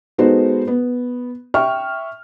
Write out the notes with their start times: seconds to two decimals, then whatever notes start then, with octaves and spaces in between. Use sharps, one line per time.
0.18 G#3 B3 D#4 F#4 A4 C5
0.67 B3
1.54 E5 G5 C#6 F6